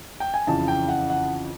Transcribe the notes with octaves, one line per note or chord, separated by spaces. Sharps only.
G5
G#5
F2 C#3 E3 A5
G5
F#5
F#5